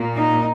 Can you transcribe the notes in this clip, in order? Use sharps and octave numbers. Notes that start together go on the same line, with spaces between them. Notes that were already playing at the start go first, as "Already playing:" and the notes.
Already playing: A#2 A#3
D#4